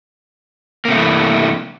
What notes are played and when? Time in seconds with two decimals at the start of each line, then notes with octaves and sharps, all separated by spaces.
0.85 A#3
0.88 C3
0.91 A3
0.94 G2
0.97 E3